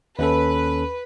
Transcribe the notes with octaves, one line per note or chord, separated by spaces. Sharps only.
D#2 C#4 A4 B4